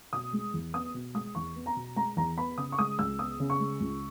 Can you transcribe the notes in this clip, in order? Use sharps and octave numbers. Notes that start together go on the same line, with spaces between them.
B2 D#6
G#3
E2
B3 D#6
B2
G#3 D#6
E2 C#6
B3
A#5
B2
G#3 A#5
E2 A#5
B3 B5
C#3 D#6
C#6
G#3 D#6
C#2 E6
B3 D#6
C#3
C#6
G#3
C#2